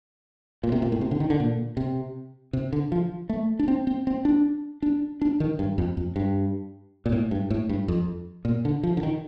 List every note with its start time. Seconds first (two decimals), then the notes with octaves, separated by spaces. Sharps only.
0.64 A#2
0.72 C3
0.82 A#2
0.92 A2
1.01 C3
1.11 D3
1.20 D#3
1.30 D3
1.40 A#2
1.77 C3
2.53 C3
2.73 D3
2.92 F3
3.29 A3
3.59 D4
3.68 C4
3.87 C4
4.07 C4
4.25 D4
4.82 D4
5.21 D4
5.40 D#3
5.59 G2
5.78 F2
5.97 F2
6.16 G2
7.06 A#2
7.12 A2
7.31 G2
7.50 A2
7.69 G2
7.88 F2
8.45 A#2
8.65 D3
8.83 F3
8.97 D3
9.03 D#3